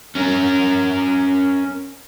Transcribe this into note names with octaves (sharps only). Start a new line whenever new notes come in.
C#4 A#4